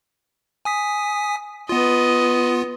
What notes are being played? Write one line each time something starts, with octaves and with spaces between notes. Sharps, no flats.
G#5 D#6 B6
B3 F4 B4 D#5